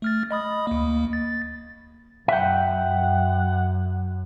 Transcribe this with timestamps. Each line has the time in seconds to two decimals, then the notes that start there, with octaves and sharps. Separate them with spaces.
0.02 A3 F6 A6
0.31 D#5 B5 D#6
0.67 D2 A#3
1.13 A6
2.28 F#2 E5 F#5 G5